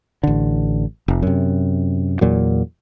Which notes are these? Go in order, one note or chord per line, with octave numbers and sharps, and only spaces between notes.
A1 D3
F1
F#2 C3
E2 A#2 F#3